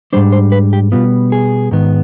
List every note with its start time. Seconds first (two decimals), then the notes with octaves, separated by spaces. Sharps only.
0.13 G#2 G3 D4 C5
0.32 C5
0.52 B4
0.73 G4
0.92 B2 G3 B3 F4
1.32 G#4
1.71 G#2 D#3 B3